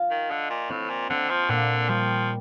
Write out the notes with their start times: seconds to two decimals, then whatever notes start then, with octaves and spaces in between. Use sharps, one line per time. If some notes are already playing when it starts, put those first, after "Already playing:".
Already playing: F4
0.11 D#3
0.31 D3 D#5
0.50 A#2
0.70 A2 C4
0.90 A#2
1.10 D3 C4
1.30 F3
1.49 A#2 D3
1.89 F3 G3